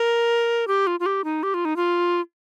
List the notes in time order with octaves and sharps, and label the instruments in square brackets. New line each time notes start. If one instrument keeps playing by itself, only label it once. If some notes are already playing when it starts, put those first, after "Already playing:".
Already playing: [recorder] A#4
G4
F4
F4
G4
D#4
G4
F4
D#4
F4